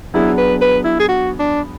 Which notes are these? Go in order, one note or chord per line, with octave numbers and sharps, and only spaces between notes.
F#3 B3 D4 E4 G#4
B4
B4
E4
G#4
F#4
D4